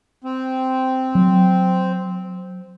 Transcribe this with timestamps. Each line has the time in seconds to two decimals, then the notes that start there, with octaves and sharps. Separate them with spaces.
0.24 C4
1.15 F#3